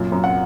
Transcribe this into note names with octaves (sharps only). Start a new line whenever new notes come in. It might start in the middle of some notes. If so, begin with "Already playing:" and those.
Already playing: F#2 A#2
F#2
F#5